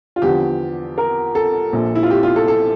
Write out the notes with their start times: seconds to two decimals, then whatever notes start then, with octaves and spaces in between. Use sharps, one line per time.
0.16 F4
0.22 E2 D3 F3 G4
0.98 A#4
1.35 A4
1.73 A#1 A#2 F3
1.95 E4
2.03 F4
2.10 G4
2.23 F4
2.36 A4
2.48 A4